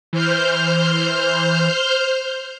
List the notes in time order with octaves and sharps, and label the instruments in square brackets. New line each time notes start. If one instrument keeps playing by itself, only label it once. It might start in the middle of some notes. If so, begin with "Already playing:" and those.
[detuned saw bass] E3 [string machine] C5 F6 G6